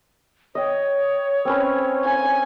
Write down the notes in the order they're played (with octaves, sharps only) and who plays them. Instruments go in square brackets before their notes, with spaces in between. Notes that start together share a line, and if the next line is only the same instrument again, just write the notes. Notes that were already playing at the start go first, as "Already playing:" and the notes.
[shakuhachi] C#5 [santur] D#5 G5
[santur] C4 C#4 B4
[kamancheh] G#5